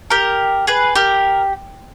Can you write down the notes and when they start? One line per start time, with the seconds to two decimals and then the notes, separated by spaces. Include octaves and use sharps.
0.10 G4 A#4
0.67 G#4 B4
0.96 G4 A#4